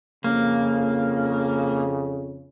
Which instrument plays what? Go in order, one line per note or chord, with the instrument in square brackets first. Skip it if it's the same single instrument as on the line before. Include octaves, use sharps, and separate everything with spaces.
[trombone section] F2 C#3 [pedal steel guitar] A#3